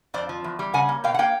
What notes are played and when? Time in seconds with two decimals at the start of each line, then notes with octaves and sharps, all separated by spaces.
0.14 F2 C5 D5
0.29 F3
0.44 E2
0.59 G3
0.74 C#3 F#5 G#5
0.89 A#3
1.04 B2 F5 G5
1.14 F#5
1.19 A#3 F5 G5